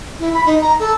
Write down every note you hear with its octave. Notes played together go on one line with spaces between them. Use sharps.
E4
B5
D#4
A#5
A4